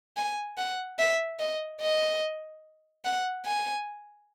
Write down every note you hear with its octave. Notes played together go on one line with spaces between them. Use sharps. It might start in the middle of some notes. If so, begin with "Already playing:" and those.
G#5
F#5
E5
D#5
D#5
F#5
G#5